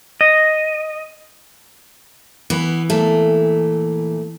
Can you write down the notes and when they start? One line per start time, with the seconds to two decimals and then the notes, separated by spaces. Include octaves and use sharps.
0.21 D#5
2.50 E3 B3
2.90 A#2 A3